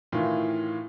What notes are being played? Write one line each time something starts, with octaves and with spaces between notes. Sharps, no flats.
A2 D#3 E3 F4